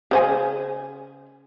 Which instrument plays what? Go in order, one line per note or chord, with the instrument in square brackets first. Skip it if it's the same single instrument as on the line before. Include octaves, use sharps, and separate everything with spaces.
[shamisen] C#3 C5 G#5